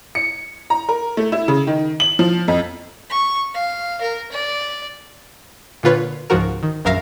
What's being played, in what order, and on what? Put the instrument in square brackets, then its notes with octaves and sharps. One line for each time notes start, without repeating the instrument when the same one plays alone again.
[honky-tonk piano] C#7
A#5
A#4
A3
E4
C#3
D#3
F#7
F3
F2
[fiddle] C#6
F5
A#4
D5
[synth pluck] A#2 D3 F4 B4 C#5
C#2 G#2 F3 F#4 A#4
D#3
A#1 F#2 A#4 E5 F5 A#6